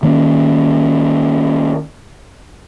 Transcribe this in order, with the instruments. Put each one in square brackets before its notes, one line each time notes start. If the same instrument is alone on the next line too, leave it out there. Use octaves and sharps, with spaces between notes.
[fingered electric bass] D#3 A#3 B3 C#4